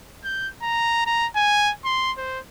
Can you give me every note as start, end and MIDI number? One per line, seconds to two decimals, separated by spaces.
0.24 0.48 91
0.62 1.02 82
1.06 1.27 82
1.36 1.72 80
1.85 2.12 84
2.18 2.39 72